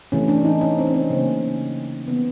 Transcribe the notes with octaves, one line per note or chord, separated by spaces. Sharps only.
C3 E3 A3 C#4
D4
D#4
C#4
C4
C#4
C4
C#3 F#3 A#3
C3 E3 A3 B3